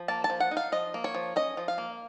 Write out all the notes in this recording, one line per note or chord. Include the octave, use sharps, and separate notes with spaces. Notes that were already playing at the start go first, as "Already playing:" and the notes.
Already playing: F3
A#3 A5
A5
F3
F#5
D#4
F5
F3 D#5
A#3
C#5
F3
C#4 D#5
F3
F5
A#3